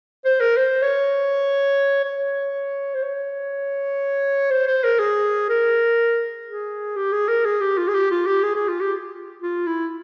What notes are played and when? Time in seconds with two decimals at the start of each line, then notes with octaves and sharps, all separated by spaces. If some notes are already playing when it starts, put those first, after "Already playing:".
0.25 C5
0.40 A#4
0.57 C5
0.82 C#5
2.05 C#5
2.95 C5
3.03 C#5
4.51 C5
4.67 C5
4.84 A#4
4.99 G#4
5.49 A#4
6.47 G#4
6.96 G4
7.12 G#4
7.28 A#4
7.45 G#4
7.61 G4
7.78 F4
7.88 G#4
7.94 G4
8.11 F4
8.26 G4
8.43 G#4
8.55 G#4
8.68 F4
8.81 G4
9.42 F4
9.66 E4